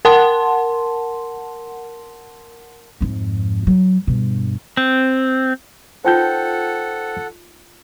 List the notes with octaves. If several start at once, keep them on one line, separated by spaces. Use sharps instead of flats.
A#4 F#5 A5 C6
F2 G#2
F#3
G2 B2
C4
D#4 F4 A4 B4 C5 F#5 G5 G6